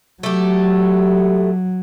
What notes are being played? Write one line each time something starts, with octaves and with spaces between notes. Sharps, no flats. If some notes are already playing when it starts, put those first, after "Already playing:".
F#3 A3 G4